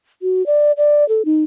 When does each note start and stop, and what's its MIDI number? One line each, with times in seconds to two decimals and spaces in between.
0.22 0.45 66
0.46 0.72 74
0.77 1.07 74
1.09 1.22 69
1.25 1.44 63